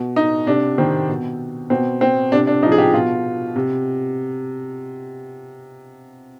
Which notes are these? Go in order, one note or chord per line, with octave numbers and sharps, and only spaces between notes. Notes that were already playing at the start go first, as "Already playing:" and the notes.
Already playing: B2
D#4
C3 D4
D#3 C4
B2
B2 C4
C4
C3 D4
D4
F3 D#4
G#4
G4
B2 F4
C3